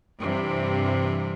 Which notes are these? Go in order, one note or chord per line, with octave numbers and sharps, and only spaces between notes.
G2 C3 E3